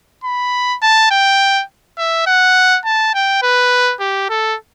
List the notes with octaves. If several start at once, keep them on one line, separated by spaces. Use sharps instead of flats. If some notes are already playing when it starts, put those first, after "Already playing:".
B5
A5
G5
E5
F#5
A5
G5
B4
G4
A4